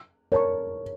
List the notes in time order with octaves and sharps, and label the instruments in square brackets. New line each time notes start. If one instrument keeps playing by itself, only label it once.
[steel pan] A#4 D5 A5 C#6 [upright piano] C#5